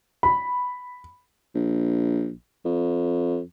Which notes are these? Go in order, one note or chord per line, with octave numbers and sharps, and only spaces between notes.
B5
A#1
F2